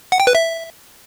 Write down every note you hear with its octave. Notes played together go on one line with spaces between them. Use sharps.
F#5
G5
B4
E5